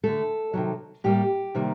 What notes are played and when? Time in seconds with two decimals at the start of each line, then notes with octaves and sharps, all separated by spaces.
0.04 D3 A3 A4
0.54 C3 D#3 F#3
1.04 A2 G3 A#3 G4
1.55 C3 D#3 G3 A#3